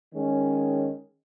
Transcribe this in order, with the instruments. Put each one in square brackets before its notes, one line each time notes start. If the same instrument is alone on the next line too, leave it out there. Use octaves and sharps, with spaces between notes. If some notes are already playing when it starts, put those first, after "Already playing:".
[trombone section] D#3 G#3 C#4